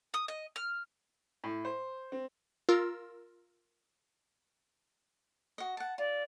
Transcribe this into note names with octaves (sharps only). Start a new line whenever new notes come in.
D#6
D#5
F6
A2
C5
C4
F4 A#4 E6
F#4 D#5
F#5 A5
F4 D5